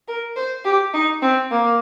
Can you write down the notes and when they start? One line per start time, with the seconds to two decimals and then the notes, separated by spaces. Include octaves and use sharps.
0.08 A#4
0.36 C5
0.65 G4
0.94 D#4
1.22 C4
1.51 A#3